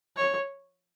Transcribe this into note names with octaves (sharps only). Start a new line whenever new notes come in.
C#5